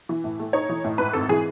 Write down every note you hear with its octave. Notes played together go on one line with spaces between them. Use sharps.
E3
A2
A3
D#4 C#5
E3
A2
G#2 B4
G#1 A4
E3 G#4